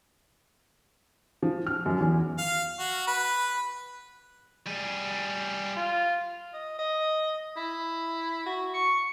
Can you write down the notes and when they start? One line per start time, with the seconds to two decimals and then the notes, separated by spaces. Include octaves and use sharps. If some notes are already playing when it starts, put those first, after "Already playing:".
1.43 F3
1.67 F6
1.86 F#2
2.00 E2
2.38 F5
2.79 F#4
3.07 B4
4.67 G3 G#4
5.76 F4
6.53 D#5
6.79 D#5
7.57 E4
8.46 F#4
8.74 C#6